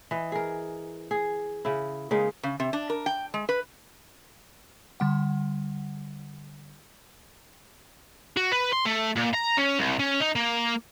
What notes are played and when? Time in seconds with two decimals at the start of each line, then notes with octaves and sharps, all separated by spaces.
0.11 E3 D#5
0.32 G#4 A#4
1.11 G#4
1.65 C#3 E4
2.11 C#3 G#3 A#3 D#4
2.43 C#3
2.60 C3
2.73 D4
2.90 A#4
3.06 G5
3.34 G#3
3.49 B4
5.00 D3 G3 F#5
8.37 F#4
8.52 B4
8.73 C6
8.86 A3
9.17 A#2
9.34 A#5
9.58 C#4
9.79 C2
9.99 C#4
10.20 D#4
10.35 A#3